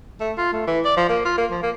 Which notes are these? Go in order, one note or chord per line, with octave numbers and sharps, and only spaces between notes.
A3
F4
A3
E3
D5
F3
A#3
F4
A#3
F3
A#3